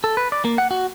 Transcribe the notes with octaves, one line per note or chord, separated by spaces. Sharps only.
A4
B4
D5
A#3
F#5
F#4